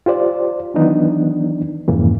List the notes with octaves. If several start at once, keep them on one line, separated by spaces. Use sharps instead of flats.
F4 G4 C5 D5
D#3 E3 F#3 B3 D4 D#4
F2 G#2 C#3 E3 A#3